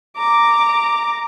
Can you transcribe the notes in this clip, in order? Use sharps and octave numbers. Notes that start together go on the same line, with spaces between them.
A#5 D6